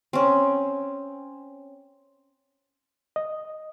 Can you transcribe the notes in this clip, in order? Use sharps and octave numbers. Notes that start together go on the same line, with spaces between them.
C4 C#4
D#5